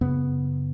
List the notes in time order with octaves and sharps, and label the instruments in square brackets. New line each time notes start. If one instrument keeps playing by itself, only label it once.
[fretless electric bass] F#2 C#3 B3